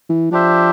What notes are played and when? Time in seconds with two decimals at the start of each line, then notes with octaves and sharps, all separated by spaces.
0.09 E3
0.31 F3 D4 G4 C5 E5